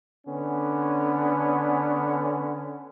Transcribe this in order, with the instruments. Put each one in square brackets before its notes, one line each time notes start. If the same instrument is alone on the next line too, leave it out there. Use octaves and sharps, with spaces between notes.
[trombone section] D3 B3 C#4